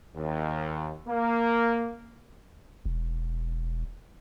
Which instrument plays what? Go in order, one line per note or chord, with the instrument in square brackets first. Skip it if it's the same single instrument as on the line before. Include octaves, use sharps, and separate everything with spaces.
[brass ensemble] D#2
A#3
[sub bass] E1